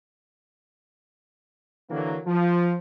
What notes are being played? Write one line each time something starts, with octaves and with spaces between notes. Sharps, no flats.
D3 E3 F#3 A#3
F3